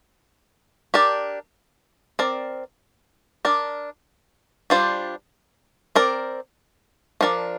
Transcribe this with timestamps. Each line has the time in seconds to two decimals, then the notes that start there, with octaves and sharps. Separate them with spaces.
0.94 D4 G4 A#4 D5
2.19 C4 A#4 D5
3.45 D4 A#4 D5
4.70 G3 D4 F4 C5
5.95 C4 A#4 D5
7.21 F3 D4 A#4 D5